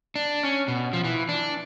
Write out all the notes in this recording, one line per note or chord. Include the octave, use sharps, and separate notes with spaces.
D4
C#4
B2
F3
E3
D4